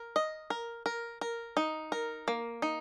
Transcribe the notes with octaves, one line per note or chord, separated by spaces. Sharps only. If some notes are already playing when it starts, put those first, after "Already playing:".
Already playing: A#4
D#5
A#4
A#4
A#4
D#4
A#4
A#3
D#4